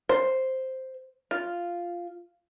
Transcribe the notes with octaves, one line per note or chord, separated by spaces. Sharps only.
C5
F4